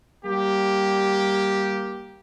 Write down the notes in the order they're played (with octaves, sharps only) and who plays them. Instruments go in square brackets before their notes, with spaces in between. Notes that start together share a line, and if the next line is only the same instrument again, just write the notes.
[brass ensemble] G3 A#3 G4